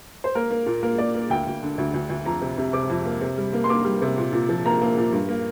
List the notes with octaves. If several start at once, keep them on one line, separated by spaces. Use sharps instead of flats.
C5
A#3 A#4
A#3
A#2
A#3 A#4
A#3 D5
A#3
D2 G5
D2
D3
D2
D2
D2
F2 A#5
C3
C3
C3 D6
F2
A#3
C3
G3
A#3
C6
A#3 D6
G3
C3
A#2
A#2
F3
A#3 A#5
A#3
A#2
G2
A#3